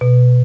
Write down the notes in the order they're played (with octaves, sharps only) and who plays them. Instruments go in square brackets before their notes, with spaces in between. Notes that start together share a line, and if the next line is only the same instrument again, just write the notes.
[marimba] B2